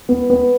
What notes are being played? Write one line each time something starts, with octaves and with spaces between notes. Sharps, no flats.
B3
B3